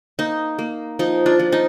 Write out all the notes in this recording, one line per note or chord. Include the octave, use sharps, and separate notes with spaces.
A#3 D#4
A#3
F3 D#4
D4 F4
F3
D#4